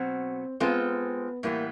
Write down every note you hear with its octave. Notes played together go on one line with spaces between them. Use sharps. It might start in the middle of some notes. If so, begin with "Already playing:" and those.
Already playing: B2 F#3 C4 F#4
G#3 B3 C4 F4 A4
A2 E3 G3 A#3 B3